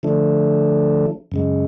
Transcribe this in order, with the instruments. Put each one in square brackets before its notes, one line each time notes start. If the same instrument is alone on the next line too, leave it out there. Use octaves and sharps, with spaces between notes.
[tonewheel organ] D3 F3 A3 D4
F#2 C#3 G#3